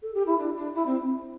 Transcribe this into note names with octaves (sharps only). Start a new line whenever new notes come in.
A4
G4
E4
D4
D4
E4
C4